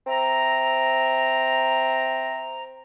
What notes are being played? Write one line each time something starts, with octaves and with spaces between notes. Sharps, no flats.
C4 E5 A#5